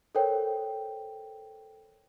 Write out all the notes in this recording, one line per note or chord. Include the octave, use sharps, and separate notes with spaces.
A4 A#4 C5 C#5 G5